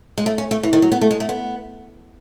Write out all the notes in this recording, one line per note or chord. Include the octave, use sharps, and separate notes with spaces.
G#3
A3
C#4
A3
E3
D#3
F#3
B3
A3
G#3
A3
B3